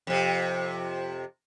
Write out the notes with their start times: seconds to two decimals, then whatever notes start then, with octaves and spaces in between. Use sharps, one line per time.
0.07 F2 C3